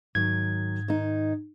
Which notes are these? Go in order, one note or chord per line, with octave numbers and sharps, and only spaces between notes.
G#2 D#3 F#3 G#6
D#3 D#4